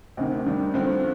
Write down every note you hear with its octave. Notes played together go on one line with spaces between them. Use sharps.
D2 C3 D#3
G2 D#3 G3 D4
G2 D3 F3 C4